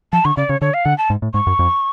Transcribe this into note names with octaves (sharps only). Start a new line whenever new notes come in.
F3 A5
D3 C#6
C#3 D5
C#3 C#5
D3 C#5
F5
D3 F#5
A5
G#2
A2
G#2 C#6
F#2
F2